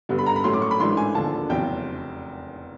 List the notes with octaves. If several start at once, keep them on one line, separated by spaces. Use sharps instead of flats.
G2 D3 G3 B3
B5
A#5
B5
A2 F#3 A3 C#4 C6
D6
C#6
B5
G#2 E3 A3 D4 C6
G#5
E1 D#2 D3 F3 A5
F1 E2 C#3 F#3 G5